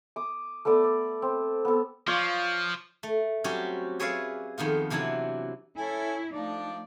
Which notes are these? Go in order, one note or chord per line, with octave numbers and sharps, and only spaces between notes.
D6 D#6
A3 B3 A4 D5
D5
C4
B3 A4
F3 F4 C#5 D5
A3
F#3 G3 C4 C#4 F#4 G4
G#4 B4 C#5 D5 E5 F5
F2 D#3 B3 F4
C3 E3 F#3 D4 E4
C#4 E4 A4 G#5
F3 A3 D4 D#4 D5